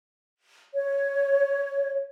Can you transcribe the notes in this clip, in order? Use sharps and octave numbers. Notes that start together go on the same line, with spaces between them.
C#5